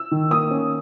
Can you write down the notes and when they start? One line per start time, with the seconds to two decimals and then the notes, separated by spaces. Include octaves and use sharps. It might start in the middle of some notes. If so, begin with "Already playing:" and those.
Already playing: E6
0.11 D#3
0.30 A#3 D#6
0.51 C#4